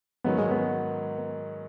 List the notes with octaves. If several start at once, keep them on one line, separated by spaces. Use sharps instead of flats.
G#2 D#3 F#3 B3 C#4 B4
G#3
B3